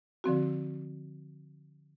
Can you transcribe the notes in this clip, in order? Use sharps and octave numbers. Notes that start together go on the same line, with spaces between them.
D3 F3 C4 F#4